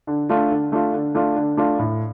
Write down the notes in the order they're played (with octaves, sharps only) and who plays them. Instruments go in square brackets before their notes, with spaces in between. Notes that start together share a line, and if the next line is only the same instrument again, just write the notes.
[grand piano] D3
A3 D4 F4
D3
A3 D4 F4
D3
A3 D4 F4
D3
A3 D4 F4
A2